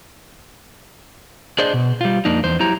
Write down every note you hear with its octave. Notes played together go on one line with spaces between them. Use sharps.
D4 G#4 C5 D5 D#5
B2
G3 F4
F2 A#3 D4 D#4
E2 C5
F#3 E4 G4 A#5